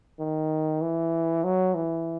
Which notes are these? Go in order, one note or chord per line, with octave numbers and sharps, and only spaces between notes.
D#3
E3
F#3
E3